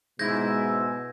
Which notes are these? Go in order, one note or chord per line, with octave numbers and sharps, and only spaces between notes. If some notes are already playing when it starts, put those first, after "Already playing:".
G#2 B2 G#3 E4 G6 G#6 A#6